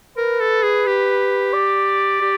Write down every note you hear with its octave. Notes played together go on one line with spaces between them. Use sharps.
A#4 B4
A4
G#4
G4
D5
G4